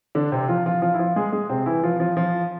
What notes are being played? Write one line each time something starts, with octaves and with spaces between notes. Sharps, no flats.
D3 D4
C3 C4
F3 F4
F3 F4
F3 F4
E4
F3 F4
G#3 G#4
G#3 G#4
C3 C4
E3 E4
F3 F4
F3 F4
F3 F4